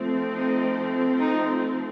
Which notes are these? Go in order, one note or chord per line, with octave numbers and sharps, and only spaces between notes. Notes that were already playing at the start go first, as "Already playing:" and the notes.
Already playing: F3 A3 C4
D#4
D#4